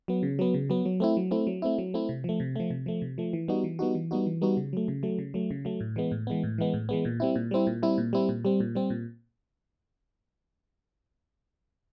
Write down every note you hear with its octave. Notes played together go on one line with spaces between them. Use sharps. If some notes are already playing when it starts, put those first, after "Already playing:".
F#3 B3
C#3
F#3 B3
C#3
F#3 B3
F#3
A3 C4 E4
F#3
A3 C4 E4
F#3
A3 C4 E4
F#3
A3 C4 E4
C3
F3 A3
C3
F3 A3
C3
F3 A3
C3
F3 A3
E3
G3 B3 D#4 F#4
E3
G3 B3 D#4 F#4
E3
G3 B3 D#4 F#4
E3
G3 B3 D#4 F#4
C#3
F#3 A3
C#3
F#3 A3
C#3
F#3 A3
C#3
F#3 A3
A2
E3 G#3 B3
A2
E3 G#3 B3
A2
E3 G#3 B3
A2
E3 G#3 B3
A#2
G3 C4 E4
A#2
G3 C4 E4
A#2
G3 C4 E4
A#2
G3 C4 E4
A#2
G3 C4
A#2
G3 C4
A#2